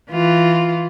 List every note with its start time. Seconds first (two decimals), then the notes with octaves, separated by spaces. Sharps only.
0.11 E3 F4